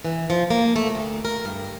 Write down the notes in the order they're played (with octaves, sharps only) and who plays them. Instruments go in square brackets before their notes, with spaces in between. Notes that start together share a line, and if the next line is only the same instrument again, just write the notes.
[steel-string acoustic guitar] E3
F3
A#3
A3
D2
A#4
G2